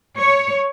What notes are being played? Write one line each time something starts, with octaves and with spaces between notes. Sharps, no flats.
C#5